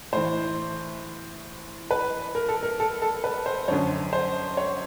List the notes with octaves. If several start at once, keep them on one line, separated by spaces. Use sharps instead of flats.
A2 E3 C5
B4
A#4
A4
A#4
A4
A4
B4
C5
F#2 D3 F3 C#5
C5
C#5